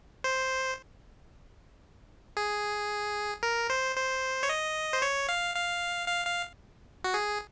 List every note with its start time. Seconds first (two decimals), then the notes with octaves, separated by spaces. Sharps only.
0.24 C5
2.37 G#4
3.43 A#4
3.70 C5
3.96 C5
4.43 C#5
4.49 D#5
4.93 C5
5.02 C#5
5.29 F5
5.55 F5
6.08 F5
6.26 F5
7.04 F#4
7.14 G#4